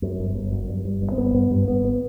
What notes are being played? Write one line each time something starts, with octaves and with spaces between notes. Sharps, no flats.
F#2
G1
G1
F#2
G2
G2
G1
C4
G1 B3
G2 B3
G2
G1 B3
B3